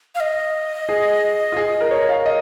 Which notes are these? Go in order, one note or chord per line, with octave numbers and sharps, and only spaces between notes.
F5
D#5
G#4
F4
G#4
A#4
C#5
F5
D#5